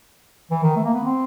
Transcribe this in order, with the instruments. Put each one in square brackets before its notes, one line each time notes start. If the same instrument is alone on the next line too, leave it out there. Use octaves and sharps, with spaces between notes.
[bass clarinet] E3
D#3
A3
A#3
B3
C4